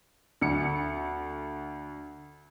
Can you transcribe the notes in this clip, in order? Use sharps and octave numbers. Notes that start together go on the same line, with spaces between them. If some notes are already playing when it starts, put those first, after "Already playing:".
D2 C#7